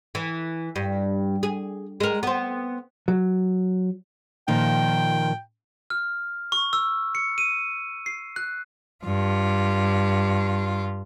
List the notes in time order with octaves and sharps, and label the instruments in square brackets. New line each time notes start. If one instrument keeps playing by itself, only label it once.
[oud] E3
G2
G#4
G#3 A#4
B3 C4
[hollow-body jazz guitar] F#3
[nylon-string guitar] A#2 D#3 F3 [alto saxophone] G5
[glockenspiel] F6
C#6
E6
C#7
D#7
C7
F#6
[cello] G2 F4